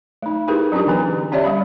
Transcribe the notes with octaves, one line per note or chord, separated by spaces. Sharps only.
A3 D#4
D#4 E4 G4 G#4 A#4 B4
F#3 C#4 D4 F4 G4
D3 E3 B3 B4
C#4 G4 C#5 D5 E5
G3 F5 B5